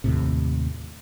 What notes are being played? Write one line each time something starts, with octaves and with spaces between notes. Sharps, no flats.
D#2 A2 C3